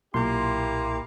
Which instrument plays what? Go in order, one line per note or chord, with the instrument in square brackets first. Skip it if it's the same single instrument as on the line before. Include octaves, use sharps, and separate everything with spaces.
[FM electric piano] B1 A#2 C6 [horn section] A#3 E4 G4